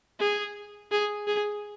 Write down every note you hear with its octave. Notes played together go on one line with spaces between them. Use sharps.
G#4
G#4
G#4